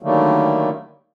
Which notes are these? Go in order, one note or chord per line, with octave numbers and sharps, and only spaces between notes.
D3 D#3 F#3 G3 A3 A#3